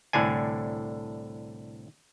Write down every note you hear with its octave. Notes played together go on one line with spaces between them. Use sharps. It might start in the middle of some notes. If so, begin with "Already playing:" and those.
C2 A2 D3 D4 G#5